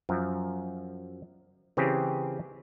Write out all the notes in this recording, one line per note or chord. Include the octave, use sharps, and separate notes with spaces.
F#2 F3
C#3 E3 C4 G4 G#4